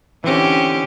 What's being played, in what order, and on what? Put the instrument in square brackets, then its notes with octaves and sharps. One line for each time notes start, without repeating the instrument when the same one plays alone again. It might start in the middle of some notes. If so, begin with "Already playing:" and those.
[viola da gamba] D3 C#4 G4 [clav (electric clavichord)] E3 C4